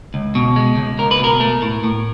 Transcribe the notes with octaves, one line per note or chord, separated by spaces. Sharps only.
C#2
B2
G#3
C#2
C#2 A#4
B4
B2 A#4
A3 A#4
A2
A2